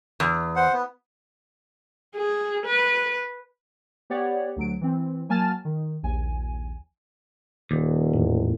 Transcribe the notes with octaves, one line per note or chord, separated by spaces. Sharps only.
E2
C5 F#5
B3
G#4
B4
B3 G4 C#5 D5 F#5
D2 F#3 D7
E3 C4
F#3 A#3 G#5 A5 F6 A6
D#3
A#1 D#2 G#5
D#1 D#2
E2 A2